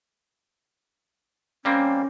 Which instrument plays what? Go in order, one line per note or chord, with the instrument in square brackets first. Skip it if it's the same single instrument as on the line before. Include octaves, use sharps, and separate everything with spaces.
[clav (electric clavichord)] G3 A#3 C4 [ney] C#4